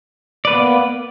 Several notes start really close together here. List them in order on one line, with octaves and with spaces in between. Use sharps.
D5 B4 A#3 B3